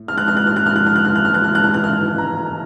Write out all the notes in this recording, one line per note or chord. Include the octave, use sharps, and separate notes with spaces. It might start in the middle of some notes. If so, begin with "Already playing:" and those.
Already playing: A2
F6
F#6
F6
F#6
F6
F#6
F6
F#6
F6
F#6
F6
F#6
F6
F#6
F6
F#6
F6
F#6
F6
A#5